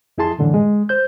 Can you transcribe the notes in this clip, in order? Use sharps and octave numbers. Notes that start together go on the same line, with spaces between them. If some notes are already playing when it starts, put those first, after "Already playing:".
F2 E4 G#4 A5 C6
F#2 A2 D3 E3
G#3
C5 G6